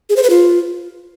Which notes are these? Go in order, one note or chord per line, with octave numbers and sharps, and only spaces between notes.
G#4
C5
B4
F4